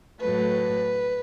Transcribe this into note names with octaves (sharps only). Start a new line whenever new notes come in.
A2 F#3 A3 B4